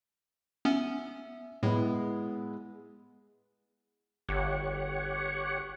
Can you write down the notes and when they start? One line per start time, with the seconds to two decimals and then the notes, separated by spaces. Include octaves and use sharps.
0.65 B3 C#4 E5
1.63 A2 G#3 B3 E4
4.29 G1 G4 C#5 F#5